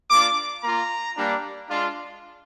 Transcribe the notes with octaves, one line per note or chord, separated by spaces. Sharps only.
A#3 D4 F4 D6
A#3 F4 A#5
G3 A#3 D4
G#3 D4 F4